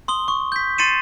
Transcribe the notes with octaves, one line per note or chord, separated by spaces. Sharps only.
C6 D#6 G7
C#6
G6 B6
C6 A6 C7 C#7 D#7 E7